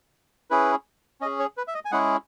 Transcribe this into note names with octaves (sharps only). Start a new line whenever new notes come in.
C#4 E4 G#4 B4
C#4 G#4 D#5
C#5
B4
E5
D#5
G#5
G#3 C#4 E4 G#4 F#5